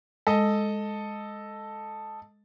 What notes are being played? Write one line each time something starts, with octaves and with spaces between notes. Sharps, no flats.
G#3 A4 D#5